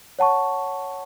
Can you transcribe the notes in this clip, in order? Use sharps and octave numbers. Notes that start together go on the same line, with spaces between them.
C#5 F#5 A5 C#6